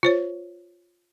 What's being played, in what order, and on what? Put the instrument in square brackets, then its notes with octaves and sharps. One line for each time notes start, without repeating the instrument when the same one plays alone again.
[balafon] F4 C5 C#5